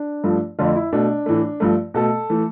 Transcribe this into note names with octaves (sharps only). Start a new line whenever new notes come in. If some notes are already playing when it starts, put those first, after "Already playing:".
Already playing: D4
G2 F3 A3
F2 D3 A3 F4
E4
B2 A3 D4
A2 E3 A3
G2 F3 A3
B2 A3 A4
E3 A3